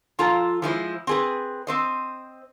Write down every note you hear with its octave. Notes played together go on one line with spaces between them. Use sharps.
F3 F4 A4 A#5
F3 G#3 E4 C5
C4 G#4 B4
C4 C5 D#5